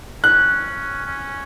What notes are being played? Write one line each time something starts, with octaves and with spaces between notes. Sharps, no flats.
C#4 F#6
C#4